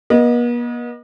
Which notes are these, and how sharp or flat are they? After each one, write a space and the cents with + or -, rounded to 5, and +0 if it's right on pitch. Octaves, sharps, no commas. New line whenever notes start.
B3 -45 D#5 +0